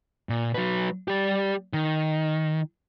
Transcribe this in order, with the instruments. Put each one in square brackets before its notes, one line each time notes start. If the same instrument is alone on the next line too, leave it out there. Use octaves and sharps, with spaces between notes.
[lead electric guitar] A#2
F#3 B4
G3 G4
D#3